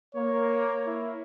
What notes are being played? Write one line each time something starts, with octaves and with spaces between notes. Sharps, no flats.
A#3 C#5
E4